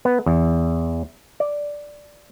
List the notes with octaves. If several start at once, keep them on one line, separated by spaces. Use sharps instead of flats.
B3
E2
D5